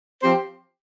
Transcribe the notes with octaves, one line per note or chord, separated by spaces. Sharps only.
F3 C4 G4 C5